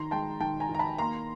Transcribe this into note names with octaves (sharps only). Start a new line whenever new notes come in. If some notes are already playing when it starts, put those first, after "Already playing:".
Already playing: D#3 A#5 C6
G#3 G5 A5
D#3 G5 A5
G#5 A#5
D#3
A#5
A5 B5
A#3 A#5 C6